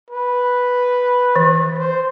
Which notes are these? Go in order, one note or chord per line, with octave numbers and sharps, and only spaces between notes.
B4
E3
C5